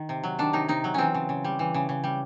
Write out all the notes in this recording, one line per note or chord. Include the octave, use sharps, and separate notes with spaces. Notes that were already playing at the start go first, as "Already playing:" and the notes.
Already playing: D#3
C3
F#3
D#3 D4
C3 D#4
C3 D#4
F#3
E3 C4 C#4
C#3
C#3
G3
E3
C#3
C#3
G3